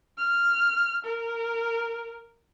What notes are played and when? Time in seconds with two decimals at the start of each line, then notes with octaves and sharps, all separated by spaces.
0.18 F6
1.05 A#4